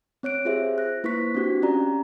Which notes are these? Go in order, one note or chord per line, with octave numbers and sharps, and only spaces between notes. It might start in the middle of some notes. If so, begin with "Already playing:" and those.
C4 C#5 F#6 D7
F4 G4 G#4 C5 E5
F#6 A#6
A#3 E4 B4 C5 C#6 B6
C4 D4 F#4 G4
C#4 F4 G4 D5 A#5